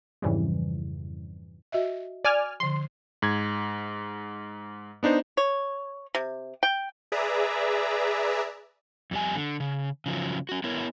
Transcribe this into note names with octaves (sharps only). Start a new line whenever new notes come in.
F2 G#2 C#3 E3 F3 G3
F#4 D#5 E5
D5 G#5 F6
D3 F3 C6
G#2 G#6
B3 D4 D#4 C5
C#5
C3
G5
G#4 B4 D5 E5 A#5
F2 G3 G#5
D3
C#3
C#3 F3 F#3
C#4 F#4
B3 E4 A#4 C#5